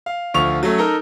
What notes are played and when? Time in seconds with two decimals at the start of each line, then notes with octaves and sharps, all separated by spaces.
0.06 F5
0.34 D2 F3 F4 C#6 F7
0.63 F#3 A3 C#4
0.78 D#4 A4 A#4